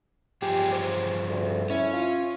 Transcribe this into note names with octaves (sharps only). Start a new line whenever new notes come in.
G2 F3 G4 G#4
C5
D2
C#4 E4
F4